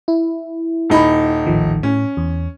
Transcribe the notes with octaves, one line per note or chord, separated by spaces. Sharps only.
E4
D#1 D#4 B5
A1 D#3 F3
A2 C#4
E2